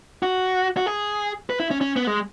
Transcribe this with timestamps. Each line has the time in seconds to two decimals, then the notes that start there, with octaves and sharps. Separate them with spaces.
0.23 F#4
0.77 F#4
0.86 G#4
1.50 B4
1.60 E4
1.71 C#4
1.81 C#4
1.96 B3
2.07 G#3